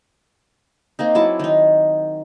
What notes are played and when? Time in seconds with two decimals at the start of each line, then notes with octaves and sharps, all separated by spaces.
0.99 A#3 C4 D#4
1.15 F#3 E4 A5 D6
1.39 D#3 D#4